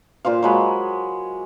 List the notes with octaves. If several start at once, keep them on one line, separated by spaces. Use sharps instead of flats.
A#2 F4 C5 F5
F#3 G#3 B5